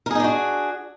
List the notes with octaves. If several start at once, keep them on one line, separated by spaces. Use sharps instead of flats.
D4 D#4 F#4 G#4 A#4